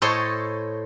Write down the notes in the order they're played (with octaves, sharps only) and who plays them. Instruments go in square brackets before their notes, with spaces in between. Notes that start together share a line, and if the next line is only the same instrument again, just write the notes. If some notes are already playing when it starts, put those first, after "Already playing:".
[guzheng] A2 A4 C5 C#5 D#5 C6